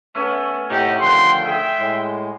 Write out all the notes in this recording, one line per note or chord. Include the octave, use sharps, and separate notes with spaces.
A3 B3 C#4 G#5
A2 C3 A3 D#4 G4 F#5
D3 D#3 F3 C5 F#5 G5 C6
G#4 E5
A2 G#3